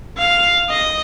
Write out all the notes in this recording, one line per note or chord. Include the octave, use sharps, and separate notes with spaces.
F5
D#5